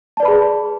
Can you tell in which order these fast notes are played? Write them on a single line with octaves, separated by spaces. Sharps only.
A5 D5 B4 B5 G#4